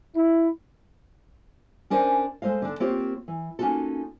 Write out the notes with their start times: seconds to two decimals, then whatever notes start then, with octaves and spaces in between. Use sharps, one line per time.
0.15 E4
1.90 C#4 D4 A#4 C5 G#5
2.42 G#3 A3 C5 D#5 F5
2.62 D3 D4
2.80 A#3 C4 F4 G4 C5 C#5
3.28 E3
3.59 A#3 C#4 D#4 F4 F#4 A4